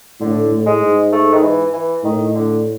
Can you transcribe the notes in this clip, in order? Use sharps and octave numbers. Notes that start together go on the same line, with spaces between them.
A2 D3
A2
G#3
G#2
A3
D#3
E3
E3
A2 D#3
D3